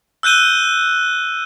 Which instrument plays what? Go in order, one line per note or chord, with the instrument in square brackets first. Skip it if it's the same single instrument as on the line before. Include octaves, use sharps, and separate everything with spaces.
[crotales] E6 F#6 G6 D#7 G7